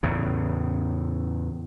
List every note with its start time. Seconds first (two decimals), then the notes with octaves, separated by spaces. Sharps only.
0.03 E2 A2 C#3